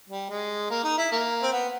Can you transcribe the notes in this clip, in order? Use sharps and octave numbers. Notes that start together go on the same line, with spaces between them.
G3
G#3
A#3
D#4
E4
A#3
C4
B3